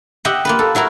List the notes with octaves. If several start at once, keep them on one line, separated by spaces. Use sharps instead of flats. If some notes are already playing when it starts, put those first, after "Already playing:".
G4 D#5 E5 F#5
A#3 F4 B4
A4
F#3 E4 F#4 A#4